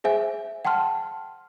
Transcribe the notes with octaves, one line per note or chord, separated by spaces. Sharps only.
G#4 C5 E5 G#5
F#5 G5 A5 C6 F6